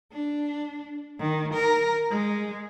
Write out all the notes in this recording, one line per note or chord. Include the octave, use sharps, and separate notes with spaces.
D4
D#3
A#4
G#3